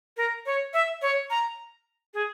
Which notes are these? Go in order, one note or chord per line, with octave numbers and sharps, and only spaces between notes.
A#4
C#5
E5
C#5
A#5
G#4